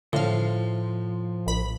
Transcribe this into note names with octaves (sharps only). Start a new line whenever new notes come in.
A2 D3 F3 F5
A#1 B5